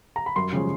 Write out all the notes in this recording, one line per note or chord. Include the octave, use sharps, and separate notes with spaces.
A#5
B5
F#2 C6
C#3 F3 G#3 C#4